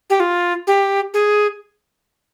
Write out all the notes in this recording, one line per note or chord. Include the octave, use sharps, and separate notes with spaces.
G4
F4
G4
G#4